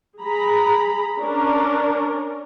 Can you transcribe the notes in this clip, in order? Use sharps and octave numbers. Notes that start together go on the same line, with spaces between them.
G#4 A#5 B5
C#4 D4 A#4